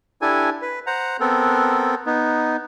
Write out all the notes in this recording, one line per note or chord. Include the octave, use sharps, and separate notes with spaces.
D4 E4 G4 A4 G#5
B4
C5 F#5 A#5
B3 C4 A4 A#4
B3 D#4